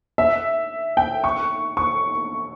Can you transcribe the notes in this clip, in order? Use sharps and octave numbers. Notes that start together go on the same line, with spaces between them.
E5
G5
C#6
C#6